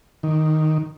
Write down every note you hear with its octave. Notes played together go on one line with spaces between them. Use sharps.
D#3